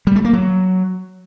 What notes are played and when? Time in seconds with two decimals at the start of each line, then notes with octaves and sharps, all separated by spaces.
0.07 G3
0.16 A3
0.25 A#3
0.33 F#3